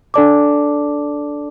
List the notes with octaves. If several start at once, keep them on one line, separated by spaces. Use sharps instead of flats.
D4 A4 D5 A5 D6